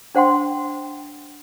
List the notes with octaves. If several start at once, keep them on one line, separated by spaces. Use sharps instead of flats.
D4 C5 F#5 G5 C6